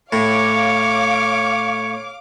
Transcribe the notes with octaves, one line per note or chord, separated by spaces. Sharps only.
A2 C#5 F5 D6